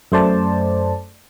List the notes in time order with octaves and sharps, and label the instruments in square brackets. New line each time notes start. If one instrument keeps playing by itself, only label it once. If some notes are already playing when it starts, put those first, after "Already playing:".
[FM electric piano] F#2 A3 C5 D5 A5